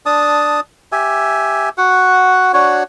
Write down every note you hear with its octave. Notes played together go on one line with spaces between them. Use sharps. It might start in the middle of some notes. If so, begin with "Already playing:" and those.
D4 A5 D#6
G4 E5 G#5
F#4 F#5
D4 F#4 C#5